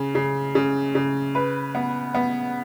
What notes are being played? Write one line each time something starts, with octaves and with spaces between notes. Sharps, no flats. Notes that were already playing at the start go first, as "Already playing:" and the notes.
Already playing: C#3
C#3
C#3
C#3
B4
B3
B3